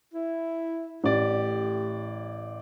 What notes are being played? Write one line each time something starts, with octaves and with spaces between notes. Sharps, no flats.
E4
A1 A2 G4 D5